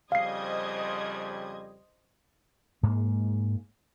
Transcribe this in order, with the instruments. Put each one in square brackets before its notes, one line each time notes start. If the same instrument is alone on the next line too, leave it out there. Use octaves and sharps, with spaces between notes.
[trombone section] F2 C#3 G3 [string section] C5 D#5 G#6 [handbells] F5 C7
[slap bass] G#2 G#3 A#3